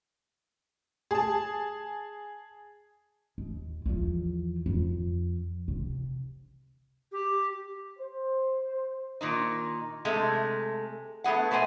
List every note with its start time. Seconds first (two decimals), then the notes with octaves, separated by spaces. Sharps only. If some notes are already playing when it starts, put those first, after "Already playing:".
1.11 G#4 A5
3.38 D#2
3.86 E2 F3
4.66 F2
5.68 C3
7.12 G4
7.99 C5
9.21 A#2 D#3 D#4
10.05 C3 G#3 A3
11.24 A3 B3 G#4 F#5
11.51 B2 A3 C5 C#5 G#5